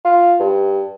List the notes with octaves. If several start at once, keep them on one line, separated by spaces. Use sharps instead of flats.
F4
G2